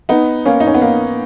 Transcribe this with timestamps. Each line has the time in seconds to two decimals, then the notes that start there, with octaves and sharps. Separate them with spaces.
0.09 B3 D#4
0.46 A#3 C#4
0.60 D#4
0.67 C#4
0.74 B3
0.82 A#3